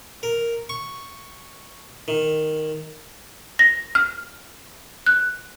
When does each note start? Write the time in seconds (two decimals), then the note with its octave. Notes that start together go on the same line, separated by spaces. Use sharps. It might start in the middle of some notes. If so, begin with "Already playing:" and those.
0.23 A#4
0.69 C#6
2.08 D#3
3.59 A#6
3.95 F6
5.06 F#6